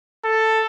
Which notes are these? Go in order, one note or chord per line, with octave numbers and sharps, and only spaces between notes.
A4